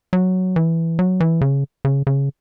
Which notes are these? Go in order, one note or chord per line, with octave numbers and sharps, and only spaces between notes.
F#3
E3
F#3
E3
C#3
C#3
C#3